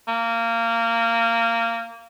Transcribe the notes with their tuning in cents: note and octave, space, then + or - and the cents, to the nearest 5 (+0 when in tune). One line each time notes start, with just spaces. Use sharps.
A#3 -20